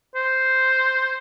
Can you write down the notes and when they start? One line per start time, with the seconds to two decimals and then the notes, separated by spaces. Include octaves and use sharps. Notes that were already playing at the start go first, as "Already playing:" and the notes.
0.16 C5